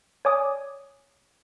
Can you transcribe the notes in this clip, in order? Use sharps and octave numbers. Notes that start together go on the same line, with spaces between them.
C#5 D5 G#5 D6 D#6